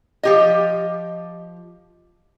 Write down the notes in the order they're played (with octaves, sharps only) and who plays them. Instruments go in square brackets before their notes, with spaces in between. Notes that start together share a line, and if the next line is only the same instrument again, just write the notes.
[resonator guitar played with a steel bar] F3 G4 D#5